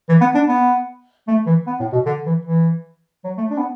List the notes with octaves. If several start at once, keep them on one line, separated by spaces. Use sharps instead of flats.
E3
B3
D4
B3
A3
E3
B3
A2
B2
D3
E3
E3
F#3
A3
D4
B3